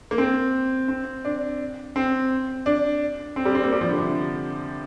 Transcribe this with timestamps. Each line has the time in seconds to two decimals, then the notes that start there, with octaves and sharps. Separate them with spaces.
0.11 A#3
0.18 C4
0.88 C4
1.25 D4
1.96 C4
2.66 D4
3.36 C4
3.45 G3
3.55 C4
3.64 A#3
3.72 G3
3.81 F3
3.90 D3
3.98 C3
4.07 D3